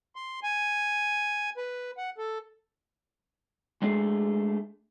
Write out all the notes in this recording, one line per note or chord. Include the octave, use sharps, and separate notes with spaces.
C6
G#5
B4
F#5
A4
G#3 A3 D4 G#4